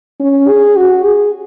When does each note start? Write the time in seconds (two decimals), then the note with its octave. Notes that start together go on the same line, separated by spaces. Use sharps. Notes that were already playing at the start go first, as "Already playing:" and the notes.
0.20 C#4
0.48 G#4
0.76 F#4
1.05 G#4